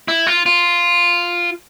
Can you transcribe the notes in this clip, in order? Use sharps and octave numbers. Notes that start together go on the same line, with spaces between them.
E4
F4
F4